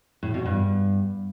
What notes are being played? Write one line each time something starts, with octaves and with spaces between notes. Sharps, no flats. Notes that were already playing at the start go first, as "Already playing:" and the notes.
A2
B2
G2